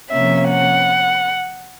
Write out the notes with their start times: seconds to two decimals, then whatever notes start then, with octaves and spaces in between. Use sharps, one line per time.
0.11 C3 F3 A#3 C#4 E5
0.49 F#5